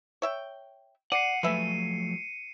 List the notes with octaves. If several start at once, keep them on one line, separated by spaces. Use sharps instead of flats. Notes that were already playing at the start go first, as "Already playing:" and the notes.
C#5 E5 G5
D5 F#5 C7 C#7 D#7
F3 F#3 A3 B4 E5 G#5